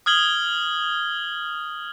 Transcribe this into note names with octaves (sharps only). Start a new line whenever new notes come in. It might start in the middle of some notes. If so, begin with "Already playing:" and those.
D#6 F6 G#6 F#7 G7